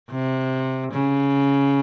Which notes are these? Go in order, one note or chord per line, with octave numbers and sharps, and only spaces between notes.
C3
C#3